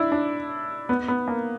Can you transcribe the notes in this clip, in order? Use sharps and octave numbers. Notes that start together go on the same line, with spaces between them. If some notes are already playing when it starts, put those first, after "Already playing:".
Already playing: D4 E4
D4
B3
B3
A#3